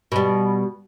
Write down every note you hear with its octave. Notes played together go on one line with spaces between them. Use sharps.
B2 G3